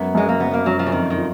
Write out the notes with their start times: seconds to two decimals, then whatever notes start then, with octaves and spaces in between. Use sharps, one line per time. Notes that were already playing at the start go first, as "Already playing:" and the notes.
Already playing: F#2 B3
0.15 F#2 G#3
0.29 A#3
0.40 F#1 B3
0.54 A#3
0.66 F#2 F#3
0.79 F3
0.86 C#3
0.92 F2 D#3
1.10 D#3
1.18 F4